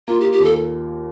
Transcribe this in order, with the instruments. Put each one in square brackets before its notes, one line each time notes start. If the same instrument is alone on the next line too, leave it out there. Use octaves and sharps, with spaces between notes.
[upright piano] A#3 [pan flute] F4
[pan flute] G4
[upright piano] F4
[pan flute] G4
[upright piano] D#2 [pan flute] A4